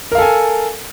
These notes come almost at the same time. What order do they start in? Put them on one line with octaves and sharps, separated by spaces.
A#4 F5 A4 G#5